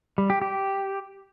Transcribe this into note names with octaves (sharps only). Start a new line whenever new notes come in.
G3
G4
G4